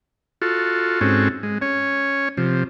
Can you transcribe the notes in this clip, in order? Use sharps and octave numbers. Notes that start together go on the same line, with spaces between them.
F4 F#4 A4
G#2 C4 C#4 F#4 A4
G#3
C#4 C#5
C3 F3